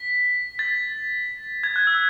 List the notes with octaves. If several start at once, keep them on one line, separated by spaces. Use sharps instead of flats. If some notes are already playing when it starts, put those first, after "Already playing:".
Already playing: B6
A6
G#6
F#6
E6